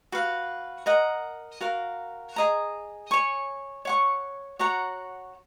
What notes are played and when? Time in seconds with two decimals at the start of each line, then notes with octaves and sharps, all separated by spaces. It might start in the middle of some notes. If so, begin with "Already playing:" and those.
0.12 F#4 B4 F5
0.86 A#4 D#5 F#5 A#5
1.61 F#4 A#4 F5
2.36 G#4 D#5 A#5
3.11 C#5 G#5 C#6
3.85 C#5 F#5 C#6
4.59 F#4 C#5 F#5 A#5